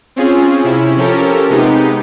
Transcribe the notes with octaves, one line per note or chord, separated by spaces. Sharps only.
C4 C#4 F4 G#4
C3 C#4 E4
F3 C#4 G4 A4 A#4
C3 G#3 B3 D#4 G4